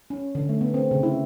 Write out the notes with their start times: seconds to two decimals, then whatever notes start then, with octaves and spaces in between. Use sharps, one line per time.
0.10 C#4
0.35 D3
0.49 A3
0.61 B3
0.74 C4
0.91 C#3
1.03 E4